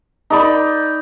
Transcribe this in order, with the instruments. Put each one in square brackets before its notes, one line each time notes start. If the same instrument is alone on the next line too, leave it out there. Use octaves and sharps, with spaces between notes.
[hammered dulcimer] D#4 D5 B5